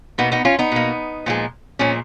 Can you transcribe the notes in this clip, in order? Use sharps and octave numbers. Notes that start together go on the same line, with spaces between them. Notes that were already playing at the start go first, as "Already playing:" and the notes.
B2 A#3 B3 D#4
B3 D#4
C#4 F4
B3 D#4
B2 A#3
A#2 F3 G#3
A#2 F3 G#3 C#4